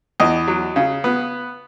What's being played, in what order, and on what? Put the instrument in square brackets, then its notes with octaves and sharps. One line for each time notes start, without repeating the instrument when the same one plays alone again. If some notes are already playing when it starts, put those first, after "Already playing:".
[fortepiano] E2 D#5
F#3
C#3
B3